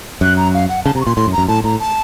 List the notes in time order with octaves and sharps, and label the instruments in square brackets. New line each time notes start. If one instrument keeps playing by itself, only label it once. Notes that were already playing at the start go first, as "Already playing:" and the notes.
[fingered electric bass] F#2 [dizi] F#6
[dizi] A#5
F5
F#5
[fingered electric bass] C#3 [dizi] A5
[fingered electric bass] C3 [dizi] A#5
[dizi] C#6
[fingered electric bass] A#2 [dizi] C6
[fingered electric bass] A2 [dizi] C6
[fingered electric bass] F#2
[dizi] A#5
[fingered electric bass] F#2
[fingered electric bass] A2 [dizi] A5
[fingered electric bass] A2 [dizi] A#5
[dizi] A5